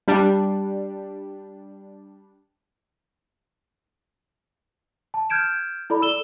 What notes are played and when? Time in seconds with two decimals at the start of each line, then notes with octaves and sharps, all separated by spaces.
0.08 G3 D4
5.14 A5
5.30 F6 G6 G#6 D7 E7
5.90 E4 A4 D5 B5
6.01 A4 E6 E7 G7